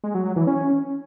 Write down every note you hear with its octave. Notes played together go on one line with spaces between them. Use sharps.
G#3
F#3
F#3
E3
C#4